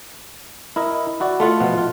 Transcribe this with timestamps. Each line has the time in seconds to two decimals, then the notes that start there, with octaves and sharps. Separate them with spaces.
0.76 E4 A#4 D#5
1.20 E4 F#4 D5
1.40 A3 F4 F#5
1.60 B2 F3 B3
1.78 F4